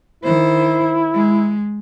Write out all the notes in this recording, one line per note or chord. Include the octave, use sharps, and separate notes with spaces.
D#3 E4 C5
G#3